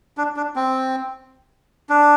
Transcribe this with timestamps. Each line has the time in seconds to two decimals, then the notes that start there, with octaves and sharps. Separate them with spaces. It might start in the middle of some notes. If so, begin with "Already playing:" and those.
0.18 D4
0.37 D4
0.56 C4
1.89 D4